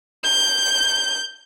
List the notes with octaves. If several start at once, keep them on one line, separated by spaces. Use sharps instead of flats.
G6